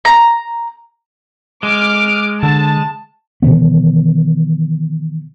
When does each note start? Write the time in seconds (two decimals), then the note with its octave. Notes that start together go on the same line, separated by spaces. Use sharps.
0.05 A#5
1.63 G#3 D6 F6
2.43 D3 A5
3.42 B2 D#3 E3 B3